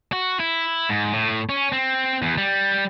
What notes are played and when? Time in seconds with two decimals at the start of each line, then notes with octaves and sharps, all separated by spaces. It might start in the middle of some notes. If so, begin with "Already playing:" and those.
0.12 F#4
0.40 E4
0.89 G#2
1.12 A2
1.49 C#4
1.72 C4
2.22 E2
2.38 G3